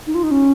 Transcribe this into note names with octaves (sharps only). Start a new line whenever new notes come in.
D#4
F4
D#4
C#4